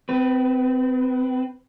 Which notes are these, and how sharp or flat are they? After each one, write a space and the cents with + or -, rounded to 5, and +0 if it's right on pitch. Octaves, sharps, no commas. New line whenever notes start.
C4 -30 B4 +0